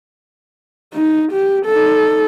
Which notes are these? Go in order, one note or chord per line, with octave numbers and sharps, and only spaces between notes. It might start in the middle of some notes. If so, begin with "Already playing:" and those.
D#4
G4
D#4 A4